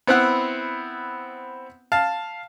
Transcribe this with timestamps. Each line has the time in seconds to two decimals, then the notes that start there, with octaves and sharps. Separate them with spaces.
0.07 B3 C4 E4 F#5
1.92 F5 A5